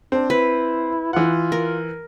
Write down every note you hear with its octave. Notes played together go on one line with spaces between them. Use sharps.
C4 D4
E4 B4
E3 F4 F#5
A#4